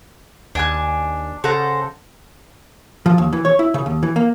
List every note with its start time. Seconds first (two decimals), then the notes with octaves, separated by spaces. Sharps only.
0.55 D#2 D4 G#5 F#6
1.44 C#3 A4 C5 F#5 A#5
3.06 F3
3.18 D#2
3.33 E3
3.45 C#5
3.59 E4
3.74 C#3
3.86 D#2
4.03 E3
4.16 A#3